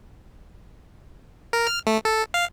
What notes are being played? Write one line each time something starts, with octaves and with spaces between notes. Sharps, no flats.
A#4
F6
A3
A4
F5